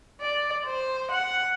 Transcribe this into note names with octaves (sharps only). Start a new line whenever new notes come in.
D5
C5
F#5